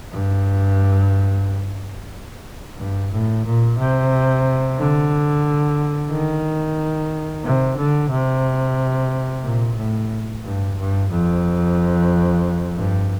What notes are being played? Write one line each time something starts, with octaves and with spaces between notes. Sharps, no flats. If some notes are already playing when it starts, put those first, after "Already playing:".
G2
G2
A2
A#2
C3
D3
D#3
C3
D3
C3
A#2
A2
G2
G2
F2
G2